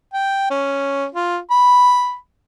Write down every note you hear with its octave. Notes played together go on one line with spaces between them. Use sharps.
G5
C#4
F4
B5